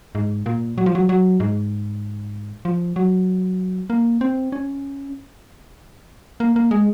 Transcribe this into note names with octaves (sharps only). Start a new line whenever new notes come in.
G#2
A#2
F#3
F3
F#3
F#3
G#2
F3
F#3
A#3
C4
C#4
A#3
A#3
G#3